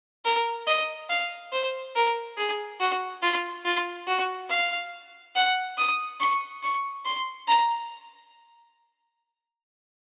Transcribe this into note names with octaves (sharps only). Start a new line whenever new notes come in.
A#4
D#5
F5
C5
A#4
G#4
F#4
F4
F4
F#4
F5
F#5
D#6
C#6
C#6
C6
A#5